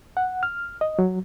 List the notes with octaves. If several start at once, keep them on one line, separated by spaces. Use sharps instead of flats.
F#5
F6
D#5
F#3